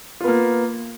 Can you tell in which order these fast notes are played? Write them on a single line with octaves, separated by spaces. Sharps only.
F4 B3 A#3